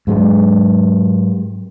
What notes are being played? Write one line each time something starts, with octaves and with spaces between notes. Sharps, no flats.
G#2 F#3 G#3